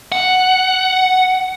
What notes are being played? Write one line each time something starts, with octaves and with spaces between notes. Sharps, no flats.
F#5